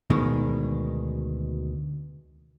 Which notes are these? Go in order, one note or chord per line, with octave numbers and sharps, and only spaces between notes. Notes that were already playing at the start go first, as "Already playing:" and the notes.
D2 B2 D#3 G#3